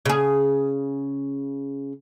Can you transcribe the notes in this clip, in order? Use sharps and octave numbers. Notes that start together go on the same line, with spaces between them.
C#3 G#4